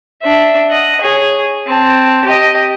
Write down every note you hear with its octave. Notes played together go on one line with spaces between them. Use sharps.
D4 E5
D#5 F#5
G#4 C#5
C4 A5
G4 D#5